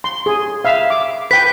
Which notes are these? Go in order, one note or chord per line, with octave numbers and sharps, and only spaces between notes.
C6
G#4
E5 F5
D6
B4 G5 B6